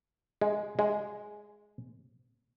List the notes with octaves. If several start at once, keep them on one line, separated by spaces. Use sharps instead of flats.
G#3
G#3